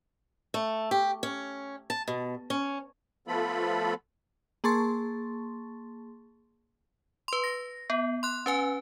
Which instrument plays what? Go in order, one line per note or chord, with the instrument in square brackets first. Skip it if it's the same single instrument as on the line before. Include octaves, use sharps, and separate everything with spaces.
[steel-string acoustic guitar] A3
G4
C#4
A5
B2
C#4
[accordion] F3 A3 B3 F4 A4 B5
[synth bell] A#3 G#4 A5 C6 C#6 A6
B4 C6
A#6
B3
C6 F#6
C#4 B4 G#5